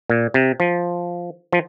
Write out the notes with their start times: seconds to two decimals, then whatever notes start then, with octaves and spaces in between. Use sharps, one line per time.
0.10 A#2
0.34 C3
0.60 F3
1.53 F3